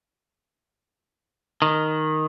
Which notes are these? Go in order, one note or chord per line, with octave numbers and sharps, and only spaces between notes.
D#3